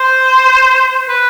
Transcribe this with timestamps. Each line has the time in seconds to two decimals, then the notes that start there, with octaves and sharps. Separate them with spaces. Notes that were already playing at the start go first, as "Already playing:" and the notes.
Already playing: C5
1.08 B4